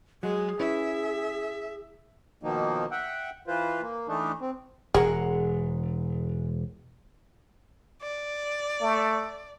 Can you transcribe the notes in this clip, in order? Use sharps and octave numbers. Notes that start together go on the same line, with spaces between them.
F#3 G#3 G#4
C#4 E4 B4 E5
B2 D#3 F3 A#3 D#4
E5 F#5 G5
E3 F4 B4 C5
A#3
E3 A3 D4 D#4
C4
E1 G#3 G#4 F#5 A#5
D5
A3